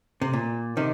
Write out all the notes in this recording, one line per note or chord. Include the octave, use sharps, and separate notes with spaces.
C3
A#2
C3 D#3